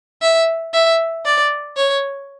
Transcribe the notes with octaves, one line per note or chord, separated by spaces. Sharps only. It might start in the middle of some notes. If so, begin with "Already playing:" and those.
E5
E5
D5
C#5